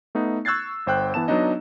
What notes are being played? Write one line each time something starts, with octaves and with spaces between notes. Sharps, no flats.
A3 B3 D#4
C#6 E6 F#6 G#6 A6 C7
G1 C5 G5 F#6
E3 B3 A5 E7
F#3 B3 D4 D#4 D#5